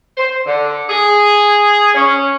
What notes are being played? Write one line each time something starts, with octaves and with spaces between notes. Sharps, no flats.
C5
D3
G#4
C#4